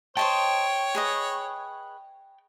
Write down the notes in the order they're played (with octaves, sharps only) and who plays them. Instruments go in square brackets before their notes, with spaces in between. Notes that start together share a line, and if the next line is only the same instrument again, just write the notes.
[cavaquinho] C5 D#5 A5 [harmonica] C#5 [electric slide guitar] G5
[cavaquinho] G#4 B4 D#5